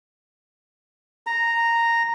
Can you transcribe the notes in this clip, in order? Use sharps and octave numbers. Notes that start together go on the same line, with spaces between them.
A#5